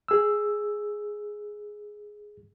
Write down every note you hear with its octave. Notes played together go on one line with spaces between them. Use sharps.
G#4 E6